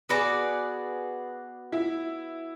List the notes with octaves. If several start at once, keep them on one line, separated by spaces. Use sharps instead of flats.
B3 F#4 G#4 B4 D5
E4